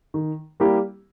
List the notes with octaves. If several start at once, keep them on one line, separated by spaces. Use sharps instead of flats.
D#3
G3 A#3 E4 G4